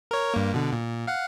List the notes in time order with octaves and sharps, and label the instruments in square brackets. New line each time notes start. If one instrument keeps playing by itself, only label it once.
[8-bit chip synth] A#4 C#5
G2 A#3
B2 D3
A#2
F5 F#5